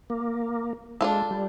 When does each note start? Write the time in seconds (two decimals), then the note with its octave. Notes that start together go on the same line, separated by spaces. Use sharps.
0.10 A#3
1.01 G#3 D4 F4 A4
1.31 G3